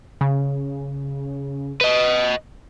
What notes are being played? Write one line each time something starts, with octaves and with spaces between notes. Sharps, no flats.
C#3
B4 D#5